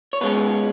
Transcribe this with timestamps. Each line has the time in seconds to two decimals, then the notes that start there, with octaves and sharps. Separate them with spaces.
0.13 C#5
0.21 B2 G#3 C#4 B4